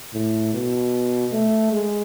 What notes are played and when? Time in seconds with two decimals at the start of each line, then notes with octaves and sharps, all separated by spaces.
0.14 A2
0.54 B2
1.33 A3
1.73 G#3